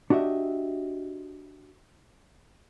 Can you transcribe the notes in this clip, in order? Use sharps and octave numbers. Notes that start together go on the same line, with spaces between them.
D4 F#4 G4 D#5 E5